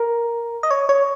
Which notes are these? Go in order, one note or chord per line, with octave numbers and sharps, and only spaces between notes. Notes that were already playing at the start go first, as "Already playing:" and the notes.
Already playing: A#4
D#5
C#5
C#5